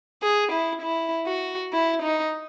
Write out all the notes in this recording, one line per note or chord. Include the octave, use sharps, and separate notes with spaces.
G#4
E4
E4
F#4
E4
D#4